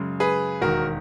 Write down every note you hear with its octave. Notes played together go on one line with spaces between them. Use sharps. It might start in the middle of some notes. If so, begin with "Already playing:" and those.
Already playing: F#2 C#3 G#3
G#4 B4
E1 D#2 D#3 F#4 A#4